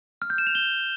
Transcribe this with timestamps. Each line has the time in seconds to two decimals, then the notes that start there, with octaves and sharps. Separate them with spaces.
0.22 F6
0.30 G6
0.38 E7
0.47 F7
0.55 G7